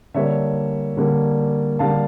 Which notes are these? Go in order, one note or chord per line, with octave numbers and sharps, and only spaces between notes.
D3 G3 A#3 C#5 E5
D3 G3 A#3
D3 G3 A#3 F5 A5